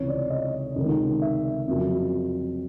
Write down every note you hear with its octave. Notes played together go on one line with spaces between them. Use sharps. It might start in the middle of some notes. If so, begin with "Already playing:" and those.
Already playing: C#2 C3 E3 C#5
D5
D#5
C#2 C3 D#3 G#3
E5
F2 C#3 F#3 A#3